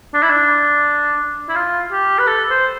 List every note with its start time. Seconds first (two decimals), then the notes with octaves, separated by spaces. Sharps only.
0.14 D4
0.23 E4
0.30 D4
1.49 E4
1.55 F4
1.91 G4
2.19 B4
2.27 A4
2.50 C5